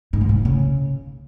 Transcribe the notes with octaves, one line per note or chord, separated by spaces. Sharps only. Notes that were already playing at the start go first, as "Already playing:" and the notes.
G#2
E2
B2
G2
C#3